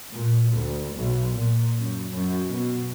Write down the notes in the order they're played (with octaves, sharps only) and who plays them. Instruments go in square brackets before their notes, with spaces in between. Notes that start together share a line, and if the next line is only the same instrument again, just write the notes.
[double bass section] A#2
D2
B1
A#2
F#2
F#2
B2